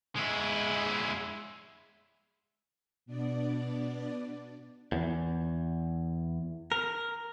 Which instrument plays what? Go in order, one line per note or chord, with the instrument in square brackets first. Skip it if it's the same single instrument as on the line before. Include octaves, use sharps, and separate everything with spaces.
[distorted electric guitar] G#3 E4
[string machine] B2 B3 D4 D5
[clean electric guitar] E2
A#4